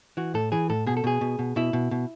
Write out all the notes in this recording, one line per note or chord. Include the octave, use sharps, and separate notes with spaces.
E3 F#4
A2 A4
E3 G#4
A2 A4
B2 G#4
A4
B2 G#4
B2
B2
B2 E4
B2
B2